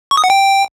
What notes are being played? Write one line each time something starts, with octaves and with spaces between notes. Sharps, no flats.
C#6
D#6
F#5
G5